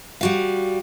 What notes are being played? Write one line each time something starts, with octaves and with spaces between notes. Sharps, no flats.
G3 F#4 F5